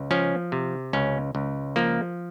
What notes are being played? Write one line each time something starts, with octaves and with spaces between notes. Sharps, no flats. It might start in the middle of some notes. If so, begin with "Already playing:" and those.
Already playing: C#2
F3 C#4
C3
C#2 C#4
C#2
F3 A#3